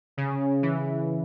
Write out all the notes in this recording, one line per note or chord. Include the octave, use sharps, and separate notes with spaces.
C#3
E3